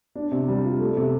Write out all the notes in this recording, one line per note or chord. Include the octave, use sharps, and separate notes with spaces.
D4
C3
G3
F4
A3
C3